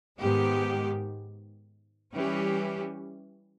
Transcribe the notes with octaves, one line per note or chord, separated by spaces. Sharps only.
G#2 D#3 G#3 B3 G4
E3 G3 C#4 G4